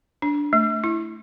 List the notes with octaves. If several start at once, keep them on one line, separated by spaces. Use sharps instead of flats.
D4
A3
E4